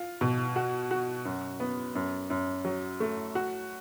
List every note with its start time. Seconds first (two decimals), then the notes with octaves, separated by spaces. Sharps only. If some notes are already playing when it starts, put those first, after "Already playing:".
Already playing: F4
0.21 B2
0.56 F#4
0.91 F#4
1.25 F#2
1.60 B3
1.95 F#2
2.30 F#2
2.65 F#3
3.00 A3
3.35 F#4